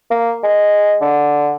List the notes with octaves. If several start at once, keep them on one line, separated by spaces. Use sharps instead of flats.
A#3
G#3
D3